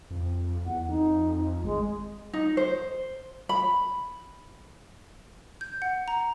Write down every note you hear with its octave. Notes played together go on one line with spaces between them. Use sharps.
F2
E2 F#5
F2 D#4
G#1 G#3
D#4
C5
B5
G6
F#5
A#5